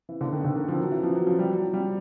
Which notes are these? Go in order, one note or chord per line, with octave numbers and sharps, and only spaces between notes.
E3
D3
D#3
D3
D#3
F3
F#3
E3
F3
F#3
F3
G3
F#3
G3